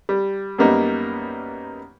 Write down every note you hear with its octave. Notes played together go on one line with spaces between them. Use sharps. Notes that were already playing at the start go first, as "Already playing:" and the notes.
G3
F#2 G3 A#3 B3 D#4